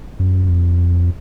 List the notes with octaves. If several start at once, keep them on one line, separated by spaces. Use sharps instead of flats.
F#2
F2